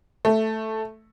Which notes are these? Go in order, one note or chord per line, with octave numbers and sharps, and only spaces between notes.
A3